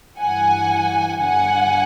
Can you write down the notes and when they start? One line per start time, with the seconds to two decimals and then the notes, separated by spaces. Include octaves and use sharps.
0.20 G2 E3 G3 F#5 G#5
1.21 G1 G2 D3 F#5 G#5